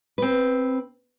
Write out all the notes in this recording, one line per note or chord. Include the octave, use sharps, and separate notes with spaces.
C4 B4